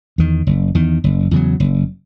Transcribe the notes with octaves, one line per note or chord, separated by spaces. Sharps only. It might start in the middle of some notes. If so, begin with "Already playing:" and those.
E2 D#3
F#1
E2 D#3
F#1
E2 C#3 F#3
F#1